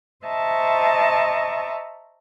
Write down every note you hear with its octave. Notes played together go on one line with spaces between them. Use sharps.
C5 D#5 E5 A5 A#5 C#6